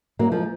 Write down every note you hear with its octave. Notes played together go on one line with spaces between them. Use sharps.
F#3 A#3
F3 G#3